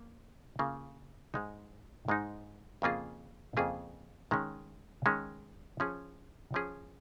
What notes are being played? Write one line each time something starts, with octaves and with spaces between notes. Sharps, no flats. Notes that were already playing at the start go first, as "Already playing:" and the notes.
Already playing: A#3
C#3 A#3 F4
G#2 G#3 D#4
G#2 G#3 D#4
F2 C#3 A#3 F4 G#4
F2 C#3 A#3 F4 G#4
D#3 G#3 C#4
D#3 G#3 C#4
F3 C#4 G#4
F3 C#4 G#4